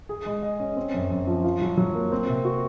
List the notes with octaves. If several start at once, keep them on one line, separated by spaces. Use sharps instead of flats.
G#4
G#3
D#5
C#4
C4
F#2
F#2
F3
F4
F#3
F#3
A#3
C4
C3
F#4